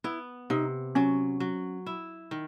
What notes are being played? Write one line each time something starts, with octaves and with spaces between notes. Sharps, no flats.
B3 E4
C3 D#4
F#3 C#4
F#3
E4
D#3